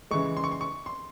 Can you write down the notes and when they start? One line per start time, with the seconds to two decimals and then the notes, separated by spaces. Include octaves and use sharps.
0.11 C#3 E3 G#3 C#6
0.37 C6
0.44 C#6
0.52 C6
0.61 C#6
0.86 C6